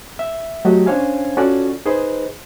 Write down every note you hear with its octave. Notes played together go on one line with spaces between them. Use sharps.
E5
F#3 A3 F#4 G4 D#5
C#4 D4 C5 C#5 F5 G#5
C#4 F4 F#4 A4 D5
D#4 G#4 B4 C5 D#5